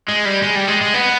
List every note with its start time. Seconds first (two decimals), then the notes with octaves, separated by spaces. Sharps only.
0.08 G#3
0.25 G3
0.42 G#3
0.55 G3
0.68 G#3
0.81 G#3
0.94 B3